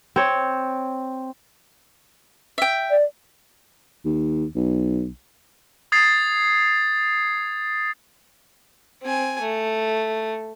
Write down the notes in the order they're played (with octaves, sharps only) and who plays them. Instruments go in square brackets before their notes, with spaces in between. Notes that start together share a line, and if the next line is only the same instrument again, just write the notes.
[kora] C4 C#5
[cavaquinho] E5 G5
[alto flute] D5
[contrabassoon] D#2
B1
[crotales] D#6 G#6 A6 C7
[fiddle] C4 G#5
A3